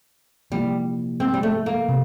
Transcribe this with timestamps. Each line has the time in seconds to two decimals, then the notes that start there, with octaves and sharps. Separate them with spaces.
0.50 C3 F3 G3 A#3 E4 G4
1.20 C4
1.34 G3
1.43 A3
1.66 A#3
1.89 C3